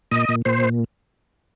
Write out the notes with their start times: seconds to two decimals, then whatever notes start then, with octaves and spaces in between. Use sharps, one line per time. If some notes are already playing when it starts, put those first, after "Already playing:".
0.11 A#2 D#5
0.29 A#2
0.45 A#2 C5